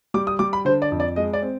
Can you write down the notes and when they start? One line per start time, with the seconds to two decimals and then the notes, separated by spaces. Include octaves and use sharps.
0.14 G3 D6
0.27 D#6
0.39 G3 D6
0.53 B5
0.65 D3 C5
0.82 D5
0.92 F2
1.00 D5
1.16 G#3 D#5
1.33 D5
1.42 C4